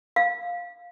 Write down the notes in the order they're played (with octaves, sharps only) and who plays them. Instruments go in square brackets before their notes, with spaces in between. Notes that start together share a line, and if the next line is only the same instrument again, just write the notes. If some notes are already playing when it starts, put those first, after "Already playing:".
[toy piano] F5